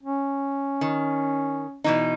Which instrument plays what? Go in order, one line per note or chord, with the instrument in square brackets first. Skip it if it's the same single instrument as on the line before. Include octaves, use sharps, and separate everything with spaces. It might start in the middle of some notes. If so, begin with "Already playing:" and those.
[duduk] C#4
[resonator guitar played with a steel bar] D#3
B2 E3 D#4